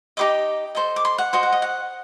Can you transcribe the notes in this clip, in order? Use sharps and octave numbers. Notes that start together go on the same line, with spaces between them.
D#4 G4 C5 D#5 D6
A4 C5 D#5
D6
C6
F#5
F#4 C5 D#5
F#5
D#5
F#5